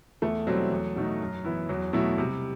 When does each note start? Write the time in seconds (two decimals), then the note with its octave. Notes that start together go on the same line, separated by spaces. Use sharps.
0.22 E2 A3
0.47 B2 F#3 G3 C4 E4
0.71 E2
0.96 B2 A3 D#4
1.21 F#2
1.45 E3 B3 E4
1.69 E2 F#3
1.93 B2 F#3 A3 E4
2.18 C3 G3